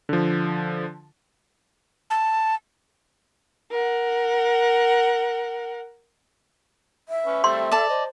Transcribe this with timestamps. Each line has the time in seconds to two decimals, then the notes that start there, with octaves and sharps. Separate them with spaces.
0.09 D3 F3
2.10 A5
3.71 A#4 F#5
7.09 E5
7.26 C#4 B4
7.44 G3 A3 C4 C6
7.71 A4 D5 A5
7.89 C5 D#5